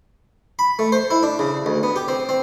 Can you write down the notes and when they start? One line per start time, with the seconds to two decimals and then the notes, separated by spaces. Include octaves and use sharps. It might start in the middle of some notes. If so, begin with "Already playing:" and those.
0.59 B5
0.79 A3
0.92 C5
1.10 E4
1.23 D4
1.39 C#3
1.66 D2
1.83 B3
1.96 G4
2.08 C4
2.29 C4